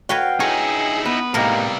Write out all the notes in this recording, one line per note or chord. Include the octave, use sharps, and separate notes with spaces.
F#4 B4 C#5 F5 G5
D#4 E4 G#4 C#5
B3 B4
A2 C3 G3 A#3 D#4 A#4